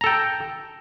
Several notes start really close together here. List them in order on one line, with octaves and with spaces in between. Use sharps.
A#5 A4 G5